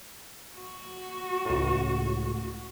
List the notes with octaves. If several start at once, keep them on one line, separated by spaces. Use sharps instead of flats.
F#4
C#2 A2